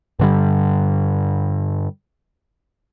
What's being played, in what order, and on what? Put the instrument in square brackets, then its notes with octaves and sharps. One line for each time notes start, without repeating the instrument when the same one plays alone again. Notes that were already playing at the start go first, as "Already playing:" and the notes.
[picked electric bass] G2 D3 G3